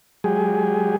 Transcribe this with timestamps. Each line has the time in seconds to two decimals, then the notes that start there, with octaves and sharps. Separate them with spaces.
0.24 F#3 G#3 G4 G#4